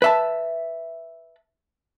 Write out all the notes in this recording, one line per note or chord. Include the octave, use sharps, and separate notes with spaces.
B4 E5 A5